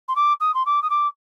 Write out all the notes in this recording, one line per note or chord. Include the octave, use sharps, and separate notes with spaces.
C6
D6
D#6
C6
D6
D#6
D6